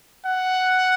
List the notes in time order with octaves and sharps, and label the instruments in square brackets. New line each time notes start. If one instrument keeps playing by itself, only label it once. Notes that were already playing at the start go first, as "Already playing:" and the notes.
[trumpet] F#5